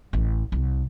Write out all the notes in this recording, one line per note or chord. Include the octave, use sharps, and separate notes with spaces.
A1
C2